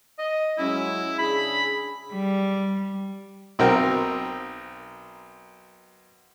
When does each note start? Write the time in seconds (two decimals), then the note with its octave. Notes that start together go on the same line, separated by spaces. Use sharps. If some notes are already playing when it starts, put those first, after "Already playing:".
0.19 D#5
0.58 F#3 G#3 C#4 E4
1.19 C#3 D4 G#4 B5
2.12 G3
3.59 B1 C4 A#4 G5